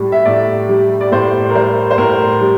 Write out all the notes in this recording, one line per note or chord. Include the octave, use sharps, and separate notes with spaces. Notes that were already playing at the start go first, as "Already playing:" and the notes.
Already playing: A2 G3
E5
A2 D5
G3
D5
A2 C5
A#4
G3 C5
C5
A2 A#4
G3